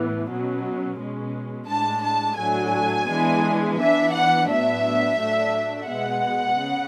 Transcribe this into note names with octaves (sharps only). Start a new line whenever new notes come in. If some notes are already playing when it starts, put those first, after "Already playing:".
Already playing: A2 E3 B3
B2 F#3 C#4
B2 G#3 C#4
A2 G#3 D4 A5
A5
A2 F#3 A3 D4 G#5
E3 G#3 B3 D4
E3 B3 D4 E5
F#5
A2 F#3 B3 D4 E5
A2 F#3 A3 D4
B2 G#3 B3 F#5
C#3